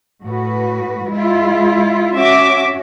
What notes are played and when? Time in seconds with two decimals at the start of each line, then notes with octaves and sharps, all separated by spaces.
0.24 A2 F#4 B4
1.08 G#3 E4 F4
2.16 C#4 F#4 E5 D6